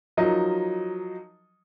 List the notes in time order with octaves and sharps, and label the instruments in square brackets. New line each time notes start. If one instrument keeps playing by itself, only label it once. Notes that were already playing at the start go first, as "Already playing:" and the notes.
[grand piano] F3 F#3 D#4 A#4 D#5